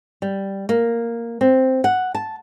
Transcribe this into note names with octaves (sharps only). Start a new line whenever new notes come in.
G3
A#3
C4
F#5
A5